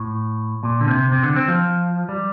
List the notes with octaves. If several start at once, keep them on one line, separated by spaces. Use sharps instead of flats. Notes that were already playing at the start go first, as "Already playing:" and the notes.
Already playing: A2
A#2
D3
C3
C3
D3
C4
F3
G3